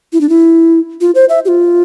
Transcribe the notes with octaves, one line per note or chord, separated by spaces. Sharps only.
E4
D4
E4
F4
C5
E5
G4
F4